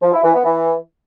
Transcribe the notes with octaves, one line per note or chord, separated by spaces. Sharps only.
F3
E4
E3
B3
E3